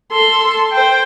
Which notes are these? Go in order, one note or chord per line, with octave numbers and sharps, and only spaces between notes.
A4 C6
C5 G5